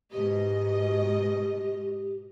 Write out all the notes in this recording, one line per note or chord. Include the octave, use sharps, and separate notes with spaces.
G#2 B2 G4 D#5